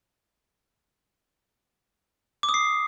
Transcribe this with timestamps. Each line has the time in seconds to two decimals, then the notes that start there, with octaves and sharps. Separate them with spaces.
2.43 D6
2.49 D#6
2.54 C7